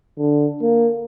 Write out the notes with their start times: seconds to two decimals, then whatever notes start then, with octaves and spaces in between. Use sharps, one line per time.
0.18 D3
0.62 A#3